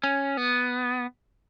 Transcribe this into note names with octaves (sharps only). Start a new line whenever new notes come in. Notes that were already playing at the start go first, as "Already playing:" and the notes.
C#4
B3